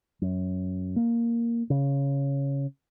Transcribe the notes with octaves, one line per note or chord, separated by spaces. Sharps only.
F#2
A#3
C#3